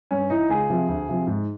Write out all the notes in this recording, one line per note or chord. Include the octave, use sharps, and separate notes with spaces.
G2 C#4
E3 D#4
C#2 G#4
C3 F3
D2
C3 F3
G#2